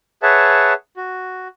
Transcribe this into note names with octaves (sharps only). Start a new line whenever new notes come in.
G#4 B4 C#5 E5 F#5 A5
F#4